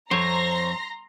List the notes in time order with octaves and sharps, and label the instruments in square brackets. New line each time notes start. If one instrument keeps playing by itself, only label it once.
[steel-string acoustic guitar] F2 [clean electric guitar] C5 C#5 [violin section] A#5 C6 A#6